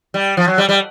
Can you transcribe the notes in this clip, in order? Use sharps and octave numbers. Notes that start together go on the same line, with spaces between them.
G3
F3
F#3
G3
G3